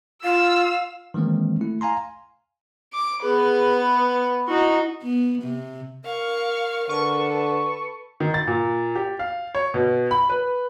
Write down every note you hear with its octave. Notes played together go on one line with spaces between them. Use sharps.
F4 F5 E6
D#3 E3 G#3 A#3 C4
A3 E4
F5 G#5 A#5 C6
D6
B3 G#4 B4
B5
D#4 E4 F#4
B3
C3
A#4 F5 C#6
D3 A4 B4 C#6
D#3
A6
A#2
G4
F5
C#5
B2
B5
B4